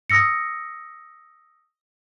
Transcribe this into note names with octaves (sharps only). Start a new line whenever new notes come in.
D#6 E6 A#6 C#7